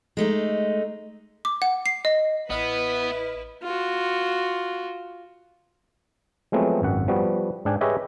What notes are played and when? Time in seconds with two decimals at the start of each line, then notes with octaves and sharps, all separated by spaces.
0.17 G#3 A3 D#4
1.45 D6
1.62 F#5
1.86 C7
2.05 D#5
2.50 A1 B3 E4 B4 D#5 F6
3.63 F4 F#4
6.52 F3 F#3 G#3 A3 B3 C4
6.82 G#1 F#2 F#5
7.08 F3 G3 B3 F#4
7.65 G#2 D4 G5 G#5
7.81 G4 G#4 B4 C#5 D#5 E5